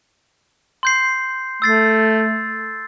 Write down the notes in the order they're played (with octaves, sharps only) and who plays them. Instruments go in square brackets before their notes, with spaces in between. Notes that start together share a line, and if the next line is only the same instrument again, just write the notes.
[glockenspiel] C6 G6 C7
[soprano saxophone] A3 [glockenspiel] E6 A6 C7